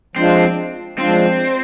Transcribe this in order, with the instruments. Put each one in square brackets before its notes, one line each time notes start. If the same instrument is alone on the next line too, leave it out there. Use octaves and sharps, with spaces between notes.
[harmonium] F3 G#3 D4 F4 [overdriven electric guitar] C4
[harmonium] F3 G#3 D4 F4 [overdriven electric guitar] C4